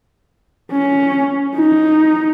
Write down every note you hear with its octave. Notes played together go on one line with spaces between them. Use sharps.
C#4
D#4